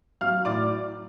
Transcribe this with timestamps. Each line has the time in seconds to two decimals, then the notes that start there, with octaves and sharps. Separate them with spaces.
0.21 F#3 F5 F6
0.45 A2 D5 D6